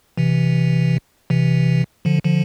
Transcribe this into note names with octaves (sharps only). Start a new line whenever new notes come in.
C3 E3
C3 E3
D3 F3
D3 F3